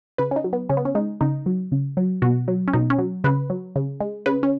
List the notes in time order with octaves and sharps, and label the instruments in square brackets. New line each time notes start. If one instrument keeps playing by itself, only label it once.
[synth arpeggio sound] C#3 B4
C#4
D#4
F#3
B3
C#3 C#4
B3
C#4
G#3 D#4
C#3 D#4
F#3
C#3
F#3
B2 F#4
F#3
C#4
B2 D#4
C#4
F#3
C#3 B4
F#3
C#3
G#3
C#3 B4
C#4